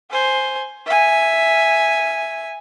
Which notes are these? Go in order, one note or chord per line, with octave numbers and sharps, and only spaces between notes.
C5 G#5
E5 G#5